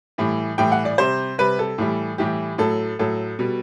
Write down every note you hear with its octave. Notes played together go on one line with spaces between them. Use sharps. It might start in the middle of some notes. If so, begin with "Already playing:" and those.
A2 E3 G3
A2 E3 G3 G5
F#5
D5
C3 G3 C5
C3 G3 B4
A4
A2 E3 G3
A2 E3 G3 G4
A2 F#3 A4
A2 F#3 A4
B2 G3